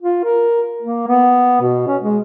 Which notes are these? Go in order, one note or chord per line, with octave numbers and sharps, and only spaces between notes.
F4
A#4
A#3
B3
B2
C#4
G#3